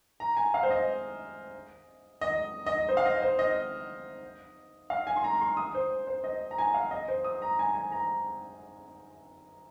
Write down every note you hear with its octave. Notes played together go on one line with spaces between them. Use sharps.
A#5
G#5
F5
C5
D#5
D#5
D#5
C5
F5
D#5
C5
D#5
F5
G#5
C6
A#5
C6
D#6
C5
C5
D#5
A#5
G#5
F5
D#5
C5
D#6
A#5
G#5
G#5
A#5